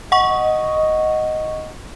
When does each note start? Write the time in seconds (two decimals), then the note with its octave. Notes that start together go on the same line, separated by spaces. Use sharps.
0.12 D#5 F#5 C#6